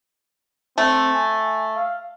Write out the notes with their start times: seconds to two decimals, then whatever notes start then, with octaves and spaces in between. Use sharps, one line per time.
0.78 A3 C4
1.14 G#5
1.76 F5